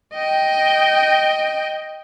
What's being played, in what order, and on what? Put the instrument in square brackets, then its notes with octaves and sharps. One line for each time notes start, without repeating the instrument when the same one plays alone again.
[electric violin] D#5 G5